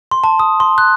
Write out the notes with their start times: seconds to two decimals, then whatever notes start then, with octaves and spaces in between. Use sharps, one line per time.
0.11 C6
0.24 A5
0.39 D#6
0.60 C6
0.78 F#6